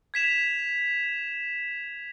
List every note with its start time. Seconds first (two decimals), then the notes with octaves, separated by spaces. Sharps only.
0.14 G#6 B6 E7 F7